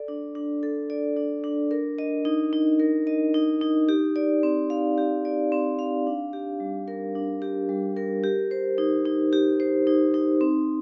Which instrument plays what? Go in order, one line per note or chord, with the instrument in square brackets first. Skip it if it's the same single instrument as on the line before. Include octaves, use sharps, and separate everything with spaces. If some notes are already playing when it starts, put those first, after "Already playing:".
Already playing: [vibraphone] A4 D5
D4
D4
A4
D5
D4
D4
A#4
D#5
D#4
D#4
A#4
D#5
D#4
D#4
G4
D5
C4
F5
G4
D5
C4
F5
D4
G4
G3
A#4
D4
G4
G3
A#4
G4
C5
D#4
D#4
G4
C5
D#4
D#4
C4